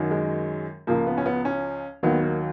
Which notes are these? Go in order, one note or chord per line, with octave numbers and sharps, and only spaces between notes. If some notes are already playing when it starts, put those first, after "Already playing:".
Already playing: F#2 D#3 F#3
G#3
C#2 C#3 F3 A#3
B3
C#4
B3
C#4
D#2 D#3 F#3 B3
A#3